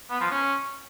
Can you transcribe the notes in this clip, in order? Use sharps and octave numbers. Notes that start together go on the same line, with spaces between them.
B3
F3
C#4